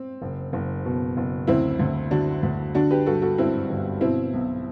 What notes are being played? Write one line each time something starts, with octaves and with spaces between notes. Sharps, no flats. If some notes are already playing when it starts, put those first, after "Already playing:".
Already playing: C4
F#1
F#1
B2
F#1
D2 C4 E4
D2
D3 D4 F#4
D2
D3 D4 F#4
G4 B4
G2 F#4 A4
F#4 A4
G2 C4 E4
G1
B2 C4 E4
B1